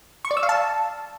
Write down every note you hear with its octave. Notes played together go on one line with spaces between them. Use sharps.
C#6
D5
E6
F5
A5